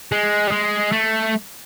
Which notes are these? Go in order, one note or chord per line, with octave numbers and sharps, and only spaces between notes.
G#3
G3
G#3
A3